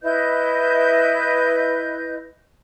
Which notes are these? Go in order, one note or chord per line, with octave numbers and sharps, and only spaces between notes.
E4 B4 D#5 G6